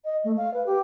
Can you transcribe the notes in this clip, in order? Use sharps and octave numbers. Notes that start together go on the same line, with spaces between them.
D#5
A3
F5
B4
G4